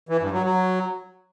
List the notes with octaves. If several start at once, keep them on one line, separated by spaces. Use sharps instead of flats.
E3
G2
F#3
F#3